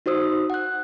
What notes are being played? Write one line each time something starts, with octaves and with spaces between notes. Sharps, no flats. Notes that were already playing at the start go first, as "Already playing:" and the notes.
D#4 F#4 C5 D#6 E6
F#5 F#6